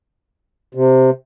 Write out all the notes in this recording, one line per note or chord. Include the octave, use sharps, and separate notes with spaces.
C3